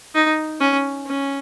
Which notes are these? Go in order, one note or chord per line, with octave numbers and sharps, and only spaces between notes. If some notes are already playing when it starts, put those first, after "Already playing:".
D#4
C#4
C#4